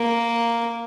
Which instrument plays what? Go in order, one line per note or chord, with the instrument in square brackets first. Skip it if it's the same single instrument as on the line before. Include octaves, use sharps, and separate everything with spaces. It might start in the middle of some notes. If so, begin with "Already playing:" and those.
Already playing: [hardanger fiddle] A#3